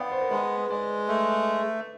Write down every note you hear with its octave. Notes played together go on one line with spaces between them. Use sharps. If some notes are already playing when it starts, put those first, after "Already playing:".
Already playing: B3 D5 F5 G5
C5
A#4
G#3 B4
G#3 D5
A3